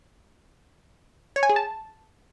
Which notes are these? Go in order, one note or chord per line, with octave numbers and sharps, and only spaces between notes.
C#5
G#5
G#4
A5